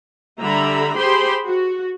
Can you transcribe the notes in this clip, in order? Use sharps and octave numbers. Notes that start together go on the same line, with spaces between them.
D3 G3 E5 A#5 B5
G4 G#4 C5 B5 C6
F#4